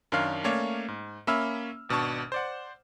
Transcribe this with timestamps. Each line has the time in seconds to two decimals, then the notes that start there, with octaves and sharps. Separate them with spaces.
0.12 F#2 D#3 D4 C#5 F5 F6
0.44 A3 A#3 C#4 C#5 D5 F5
0.88 G#2
1.27 A#3 C#4 E5 B5 E6 F6
1.89 G#1 B2 D4 A5 C#6
2.32 C5 D5 F#5